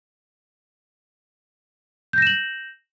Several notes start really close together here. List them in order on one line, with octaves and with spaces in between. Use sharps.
G6 A#6 E7 F#7